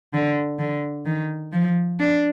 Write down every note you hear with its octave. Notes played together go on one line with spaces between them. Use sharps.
D3
D3
D#3
F3
D4